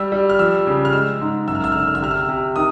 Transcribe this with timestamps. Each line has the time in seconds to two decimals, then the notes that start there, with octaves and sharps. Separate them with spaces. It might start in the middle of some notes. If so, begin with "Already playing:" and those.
Already playing: G3 E6
0.12 G3
0.30 F6
0.39 F3 E6
0.67 C#3
0.85 F6
0.93 G#3 E6
1.21 G#2
1.48 F#2 E6
1.55 F6
1.64 E6
1.72 F6
1.75 D3 E6
1.87 F6
1.95 E6
2.02 C3 F6
2.11 E6
2.29 C3
2.56 D#3 D#6